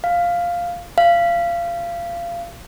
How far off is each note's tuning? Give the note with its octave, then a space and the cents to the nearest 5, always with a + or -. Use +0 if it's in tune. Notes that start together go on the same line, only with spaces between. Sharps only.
F5 +0
F5 -25